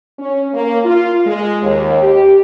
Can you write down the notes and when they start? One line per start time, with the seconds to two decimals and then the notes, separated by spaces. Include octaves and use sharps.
0.18 C#4
0.54 A#3
0.84 F4
1.26 G#3
1.62 D#2
2.02 G4